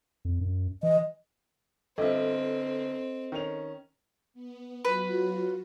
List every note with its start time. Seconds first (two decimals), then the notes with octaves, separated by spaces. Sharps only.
0.25 F2
0.41 F#2
0.83 E3 D#5
1.98 G1 C4 F4 A4 D#5 E5
3.32 D#3 C#4 F7
4.34 B3
4.85 F#3 F4 F#4 B4